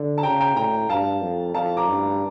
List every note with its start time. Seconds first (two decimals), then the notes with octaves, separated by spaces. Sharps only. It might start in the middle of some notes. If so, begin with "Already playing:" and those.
Already playing: D3
0.18 A5
0.23 C#3 G5 A#5
0.40 G5 A#5
0.56 A2 G5 A#5
0.89 G2 F5 A5
1.22 F2
1.54 F2 F5 A5
1.77 A#5 D6
1.88 G2